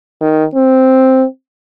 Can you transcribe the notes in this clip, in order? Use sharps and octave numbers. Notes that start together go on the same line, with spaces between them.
D#3
C4